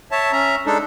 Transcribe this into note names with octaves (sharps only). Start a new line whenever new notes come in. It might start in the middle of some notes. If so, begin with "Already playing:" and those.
C#5 E5 A5
C#4 E5 A#5
G#3 D4 D#4 A4